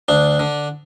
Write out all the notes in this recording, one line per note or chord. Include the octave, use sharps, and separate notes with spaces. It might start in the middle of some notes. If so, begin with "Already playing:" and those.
D2 D4
D3